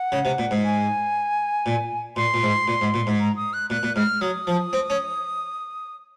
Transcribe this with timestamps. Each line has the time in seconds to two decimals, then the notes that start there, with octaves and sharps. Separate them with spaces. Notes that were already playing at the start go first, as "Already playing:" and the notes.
Already playing: F#5
0.12 C#3
0.25 C3
0.38 A#2
0.51 G#2
0.64 G#5
1.66 A#2
2.16 A#2 C6
2.34 A#2
2.43 G#2
2.68 A#2
2.81 G#2
2.94 A#2
3.07 G#2
3.20 A#5
3.36 D#6
3.53 F#6
3.70 A#2 F#6
3.83 A#2
3.96 G#2 F6
4.21 F#3 D#6
4.47 F3
4.73 C4
4.90 C#4